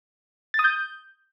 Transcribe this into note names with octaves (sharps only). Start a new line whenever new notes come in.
A6
D#6
G6